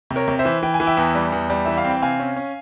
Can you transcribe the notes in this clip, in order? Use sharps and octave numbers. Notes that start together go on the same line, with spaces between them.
C3
A#4 C#5
C3
C5 E5
E3
E3 G5
G#5
E3
E5 G5
E2
G3
E2
G3
E3 E5
F5
C4
G5
C3 F5 G#5
C#4
C#4